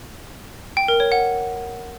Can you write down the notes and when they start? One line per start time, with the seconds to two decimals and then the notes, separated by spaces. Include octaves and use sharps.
0.77 G5
0.88 A#4
1.00 C#5
1.12 F#5